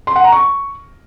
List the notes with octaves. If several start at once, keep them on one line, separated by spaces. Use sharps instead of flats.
C6
F#5
A#5
C#6